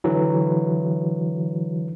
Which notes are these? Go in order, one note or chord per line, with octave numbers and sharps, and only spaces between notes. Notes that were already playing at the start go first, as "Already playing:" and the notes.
D3 E3 F#3